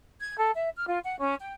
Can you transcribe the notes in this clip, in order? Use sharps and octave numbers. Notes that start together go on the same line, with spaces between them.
G#6
A4
E5
F6
F4
F#5
C#4
G5